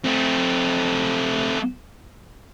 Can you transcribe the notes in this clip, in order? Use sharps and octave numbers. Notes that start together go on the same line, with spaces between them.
A3 C4